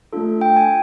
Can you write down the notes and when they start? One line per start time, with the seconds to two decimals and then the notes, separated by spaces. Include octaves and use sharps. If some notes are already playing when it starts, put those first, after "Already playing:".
0.13 A3 D4 F4 A4
0.41 G5
0.57 G#5